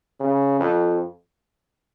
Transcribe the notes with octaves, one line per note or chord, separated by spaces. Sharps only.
C#3
F2